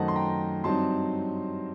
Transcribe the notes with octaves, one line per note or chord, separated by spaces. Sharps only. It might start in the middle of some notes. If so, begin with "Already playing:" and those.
Already playing: F#2 D#3 A3 C5 D#5 F#5 A5
C6
G5 A#5
G2 F#3 C4 D#4 A5 C6